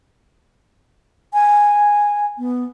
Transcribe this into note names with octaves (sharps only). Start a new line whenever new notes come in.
G#5
B3